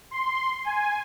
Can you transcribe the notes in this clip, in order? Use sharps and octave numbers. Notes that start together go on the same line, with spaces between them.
C6
G#5